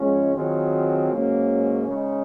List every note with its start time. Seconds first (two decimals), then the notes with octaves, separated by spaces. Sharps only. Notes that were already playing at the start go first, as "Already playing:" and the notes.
Already playing: G#2 F3 G#3 C#4
0.33 D#3 F#3 C4 F4 G#4
1.10 G#2 F#3 A#3 C#4
1.87 C#3 G#3 D#4